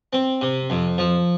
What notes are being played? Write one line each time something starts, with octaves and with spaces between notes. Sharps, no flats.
C4
C3
F2
F3